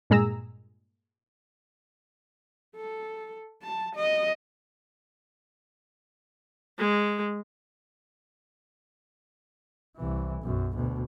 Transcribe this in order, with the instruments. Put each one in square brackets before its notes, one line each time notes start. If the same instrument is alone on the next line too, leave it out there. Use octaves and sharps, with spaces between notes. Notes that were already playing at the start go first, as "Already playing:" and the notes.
[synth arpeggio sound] G2 A#2 G#3 G#4 A#5 E6
[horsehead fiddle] A4
A5
D#5
[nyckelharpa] G#3
[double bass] C2 E3
B1 F#2
D2 B2